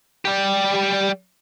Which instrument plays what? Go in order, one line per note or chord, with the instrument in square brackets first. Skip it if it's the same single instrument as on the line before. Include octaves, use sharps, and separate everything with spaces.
[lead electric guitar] G3 G4